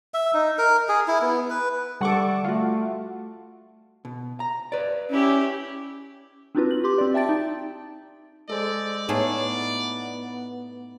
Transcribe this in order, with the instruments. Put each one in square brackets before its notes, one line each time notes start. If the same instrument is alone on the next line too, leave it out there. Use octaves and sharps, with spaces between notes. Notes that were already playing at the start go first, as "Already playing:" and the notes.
[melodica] E5
D#4
A#4
G#4
E4
B3
B4
[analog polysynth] D3 C#6 D6 [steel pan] G3 A4 [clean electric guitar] F#5
[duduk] A3 [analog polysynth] F4 F#4
[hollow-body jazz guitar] B2
A#5
B4 D5
[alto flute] C#4 [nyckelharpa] E4 G4
[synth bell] C4 D4 D#4 F4 F#4 B4
F#7
G4 C6 D6
C4 D5
E5 G5 A5 A6 D7
D#4
[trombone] G#3 [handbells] A4 C5 [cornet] D5
[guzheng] A2 A3 G#4 [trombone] B3 [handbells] D#4